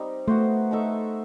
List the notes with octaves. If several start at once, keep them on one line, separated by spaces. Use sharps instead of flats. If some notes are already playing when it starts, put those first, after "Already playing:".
Already playing: G3 C4 D#4
A3 B3 F#4 C5
A3 D#4 A4 E5